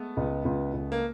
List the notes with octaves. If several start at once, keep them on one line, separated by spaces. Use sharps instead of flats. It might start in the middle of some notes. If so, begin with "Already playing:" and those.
Already playing: G#3 A3 B3
C#2
C#2
C#2
A#3